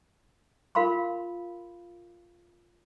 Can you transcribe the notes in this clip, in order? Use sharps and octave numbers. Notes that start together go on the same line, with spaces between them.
F4 A#4 F5 B5 C6